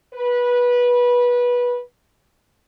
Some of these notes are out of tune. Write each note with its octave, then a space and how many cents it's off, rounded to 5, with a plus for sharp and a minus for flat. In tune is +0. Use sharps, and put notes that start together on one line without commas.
B4 -20